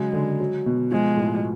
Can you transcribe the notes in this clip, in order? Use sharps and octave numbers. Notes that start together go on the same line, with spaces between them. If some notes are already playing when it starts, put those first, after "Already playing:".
Already playing: C#3 F#3 G#3
D3
F#3
B2
F3 G#3
A2